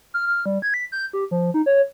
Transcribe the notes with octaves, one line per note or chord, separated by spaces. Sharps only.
F6
F6
G3
G#6
B6
G6
G4
F3
D#4
C#5